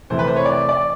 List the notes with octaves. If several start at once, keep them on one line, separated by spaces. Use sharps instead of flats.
C3 E3 A3 C5
B4
C5
C#5
D5
D5